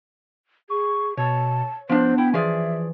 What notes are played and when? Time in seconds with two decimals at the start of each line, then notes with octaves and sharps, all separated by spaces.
0.70 G#4 C#6
1.17 B2 C#5 A5
1.89 F3 B3 D4 C5
2.18 E4 G5
2.34 E3 F3 G#4 D5 E5